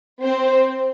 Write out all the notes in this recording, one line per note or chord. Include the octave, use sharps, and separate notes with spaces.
C4 C5